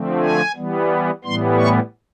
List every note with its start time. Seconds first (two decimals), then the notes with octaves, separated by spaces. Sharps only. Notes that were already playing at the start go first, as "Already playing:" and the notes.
Already playing: D3 F3 A3 C4
0.21 G#5
0.55 E3 G3 B3
1.24 A2 E3 G3 B3 C6
1.58 C#6